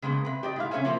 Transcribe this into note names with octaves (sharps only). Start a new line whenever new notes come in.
C#3 G#3 A#3 B3
C3 B4
G4 D5 D#5
G#2 E4 F5
C3 C#4 A#4 C#5 E5 G#5
F3 A#3 E4 F4 C5